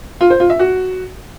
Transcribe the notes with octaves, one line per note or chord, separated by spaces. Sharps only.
F4
C5
F4
E5
F#4